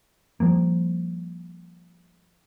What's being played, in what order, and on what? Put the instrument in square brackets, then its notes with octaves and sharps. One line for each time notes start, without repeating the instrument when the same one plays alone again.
[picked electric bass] F3 G3 A#3